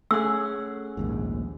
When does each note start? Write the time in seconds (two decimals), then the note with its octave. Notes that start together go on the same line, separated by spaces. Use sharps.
0.11 A3 C#4 G#4 F#5 E6
0.97 A#1 D#2 G#2